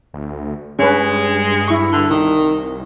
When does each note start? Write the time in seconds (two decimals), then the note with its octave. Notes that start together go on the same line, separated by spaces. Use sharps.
0.14 D2
0.79 G2 G#3 C#4 B4
1.68 E4 C#6
1.92 D3
2.10 C2 D#3